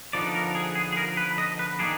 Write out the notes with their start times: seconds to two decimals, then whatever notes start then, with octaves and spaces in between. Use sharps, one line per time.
0.13 D3 F3 B3 D#4 D5
0.35 A#4
0.55 G#4
0.75 G#4
0.92 G#4
0.97 A#4
1.17 B4
1.38 D#5
1.59 B4
1.79 D#3 A#3 D4 G#4